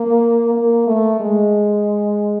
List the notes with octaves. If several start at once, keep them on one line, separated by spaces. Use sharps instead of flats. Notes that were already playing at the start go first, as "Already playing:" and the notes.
Already playing: A#3
A#3
A3
G#3